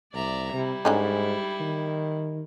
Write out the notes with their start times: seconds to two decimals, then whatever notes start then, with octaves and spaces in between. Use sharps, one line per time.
0.14 C2 D5 E5 A#5
0.53 C3 G3 E4
0.85 G#2 D3 C#4 D#4
1.60 D#3